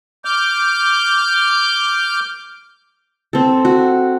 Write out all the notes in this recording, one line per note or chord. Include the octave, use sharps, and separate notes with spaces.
D6 F6 G6
C4 A4
F#4